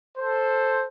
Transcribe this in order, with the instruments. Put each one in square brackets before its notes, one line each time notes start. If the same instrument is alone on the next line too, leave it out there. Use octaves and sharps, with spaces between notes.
[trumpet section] A4 C5